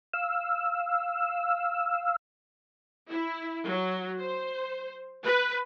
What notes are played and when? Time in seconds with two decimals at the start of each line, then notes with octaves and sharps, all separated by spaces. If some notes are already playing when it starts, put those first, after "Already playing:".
0.14 F5 E6
3.10 E4
3.70 F#3
4.22 C5
5.26 B4